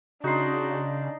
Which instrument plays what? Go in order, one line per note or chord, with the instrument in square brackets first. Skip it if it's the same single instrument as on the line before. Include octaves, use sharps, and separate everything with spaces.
[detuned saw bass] C#3 [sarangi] D4 [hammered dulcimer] D#4 C6 [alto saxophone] F#4